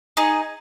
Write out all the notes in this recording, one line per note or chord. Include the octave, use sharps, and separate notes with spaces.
D#4 G#4 D#5